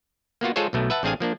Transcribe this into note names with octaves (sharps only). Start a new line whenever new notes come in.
A#3 B3 F4 F#4
G#3 F4 G#4 A4 C5 C#5
B1 B2 A3
B4 E5 F#5 A5
A1 C4 D4 G#4 F5 G#5
F3 A#3 D4